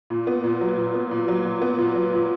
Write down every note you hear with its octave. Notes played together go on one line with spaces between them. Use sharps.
A#2
B3
A#2
F#3
A#2
B3
A#2
F#3
A#2
B3
A#2
F#3
A#2